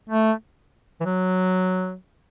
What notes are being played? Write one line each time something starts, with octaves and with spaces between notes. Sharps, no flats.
A3
E3
F#3